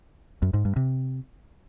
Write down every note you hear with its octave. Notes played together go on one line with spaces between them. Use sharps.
F#2
G#2
G2
C3